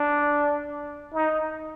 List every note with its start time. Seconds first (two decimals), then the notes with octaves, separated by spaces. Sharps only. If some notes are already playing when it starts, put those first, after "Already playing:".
Already playing: D4
1.13 D#4